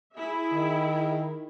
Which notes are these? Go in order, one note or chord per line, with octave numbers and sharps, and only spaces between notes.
E4 G#4 E5
D#3